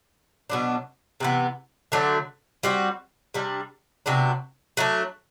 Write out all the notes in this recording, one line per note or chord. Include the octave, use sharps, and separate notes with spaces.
B2 F#3 B3 D4
C3 E3 B3
D3 F#3 A3 D4
G3 C4 F#4
C3 G3 D4
C3 F#3 B3 D4
F#3 A3 D4